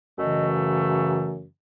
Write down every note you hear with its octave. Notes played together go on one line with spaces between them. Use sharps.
F#2 C#3 E3 A3 D#5